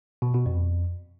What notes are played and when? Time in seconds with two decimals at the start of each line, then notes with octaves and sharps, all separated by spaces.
0.22 B2
0.34 B2
0.46 F2